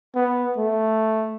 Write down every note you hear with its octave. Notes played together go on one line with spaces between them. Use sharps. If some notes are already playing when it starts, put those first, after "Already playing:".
B3
A3